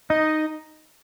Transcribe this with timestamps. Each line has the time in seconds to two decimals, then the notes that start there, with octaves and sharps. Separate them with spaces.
0.10 D#4 D#5